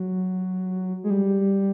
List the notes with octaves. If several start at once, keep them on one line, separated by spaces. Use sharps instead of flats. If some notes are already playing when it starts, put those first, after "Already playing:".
Already playing: F#3
G#3
G3